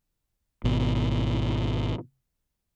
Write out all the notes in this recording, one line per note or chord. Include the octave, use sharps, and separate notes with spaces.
G#1 B2